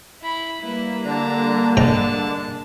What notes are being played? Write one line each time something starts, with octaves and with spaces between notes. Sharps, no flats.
E4 B5
G3 A#3 E4 B4
D3 D4 A5 A#5
G#2 G#3 G5 A5 A#5